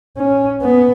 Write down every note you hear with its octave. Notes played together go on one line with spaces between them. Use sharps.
C#4
B3